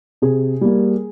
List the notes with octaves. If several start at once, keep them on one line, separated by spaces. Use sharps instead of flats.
C3 G#4
G3 A#3